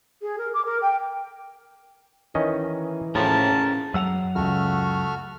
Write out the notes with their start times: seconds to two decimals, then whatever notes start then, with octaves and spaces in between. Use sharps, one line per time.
0.22 G#4
0.38 A#4
0.54 D6
0.65 A#4
0.82 G5
2.35 D#3 E3 C#4 D#5
3.15 A2 F3 C#4 G#4 A#4 A5
3.94 F#2 F#3 F#5 E6 F7
4.35 C#2 A3 F#4 F6